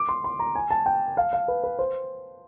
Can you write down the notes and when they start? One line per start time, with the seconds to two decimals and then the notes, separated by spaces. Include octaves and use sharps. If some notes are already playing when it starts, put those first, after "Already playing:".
Already playing: D6
0.09 C6
0.24 C6
0.39 A#5
0.55 G#5
0.71 A5
0.86 G5
1.17 F5
1.33 F5
1.48 B4
1.64 B4
1.79 C5